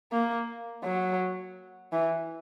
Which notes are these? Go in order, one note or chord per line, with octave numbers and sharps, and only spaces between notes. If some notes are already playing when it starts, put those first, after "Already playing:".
A#3
F#3
E3